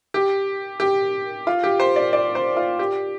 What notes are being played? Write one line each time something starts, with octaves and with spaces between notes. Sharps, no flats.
G4
G4
F4
G4
C5
D5
D5
C5
F4
G4